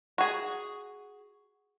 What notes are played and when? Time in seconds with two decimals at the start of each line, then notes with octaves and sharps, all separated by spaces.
0.18 F#4 G#4